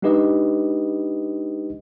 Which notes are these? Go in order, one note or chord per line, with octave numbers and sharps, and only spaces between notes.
G#3 D4 D#4 G4 B4 D#5